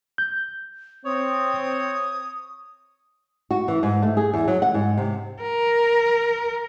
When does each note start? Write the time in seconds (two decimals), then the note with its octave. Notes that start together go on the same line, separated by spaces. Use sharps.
0.18 G6
1.06 C4 C#5 D#6
3.51 F#4
3.68 E3
3.83 G#2
4.02 A3
4.17 G#4
4.34 E2
4.48 F#3
4.62 F#5
4.74 G#2
4.97 C3
5.42 A#4